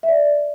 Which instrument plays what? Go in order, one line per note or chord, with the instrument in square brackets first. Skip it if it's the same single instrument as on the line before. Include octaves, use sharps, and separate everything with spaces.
[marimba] E5
D5